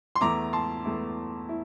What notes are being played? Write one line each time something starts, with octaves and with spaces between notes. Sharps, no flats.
C6
E2 E3 A3 E4 A#5 D6
A5 C6
E2 E3 A3 E4
E4